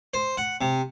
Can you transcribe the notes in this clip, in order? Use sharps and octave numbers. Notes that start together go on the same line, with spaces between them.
C5
F#5
C3